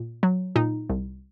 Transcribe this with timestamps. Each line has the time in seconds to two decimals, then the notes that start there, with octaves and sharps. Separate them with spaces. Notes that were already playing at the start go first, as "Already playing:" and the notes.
Already playing: A#2
0.23 F#3
0.56 A#2 D#4
0.89 C2